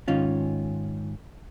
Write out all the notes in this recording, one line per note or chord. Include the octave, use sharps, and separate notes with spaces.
G#2 D#3 C#4 F4